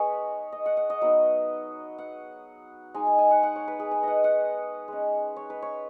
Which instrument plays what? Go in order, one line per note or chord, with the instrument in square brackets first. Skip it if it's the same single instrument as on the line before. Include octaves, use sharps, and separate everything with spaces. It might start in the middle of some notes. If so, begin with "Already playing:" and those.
Already playing: [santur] G#3 B3 D#4 G#4 B4 C#5 D#5
D#5
F#5
F#5
D#5
F#3 B3 D#4
F#5
G#3 D#4 G#5
G#5
G#5
F#5
F#5
C#5
B4
G#4
B4
D#5 F#5
F#5
G#3 C#4
C#5
B4
C#5